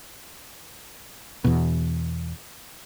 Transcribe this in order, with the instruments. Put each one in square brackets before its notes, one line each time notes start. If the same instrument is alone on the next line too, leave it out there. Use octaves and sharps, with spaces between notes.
[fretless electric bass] E2 B2